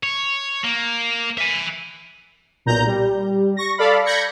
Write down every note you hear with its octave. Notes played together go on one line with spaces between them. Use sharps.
C#5
A#3
E5 G#5
B1 A#2 A#5 G6
G3
C#6 A#6
A4 D5 F5 B5
B5 G6 G#6 A#6 B6 C#7